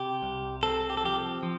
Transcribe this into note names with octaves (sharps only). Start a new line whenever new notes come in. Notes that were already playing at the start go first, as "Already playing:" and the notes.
Already playing: C3 G4
C2
C4 A4
G4
A4
F3 G4
F3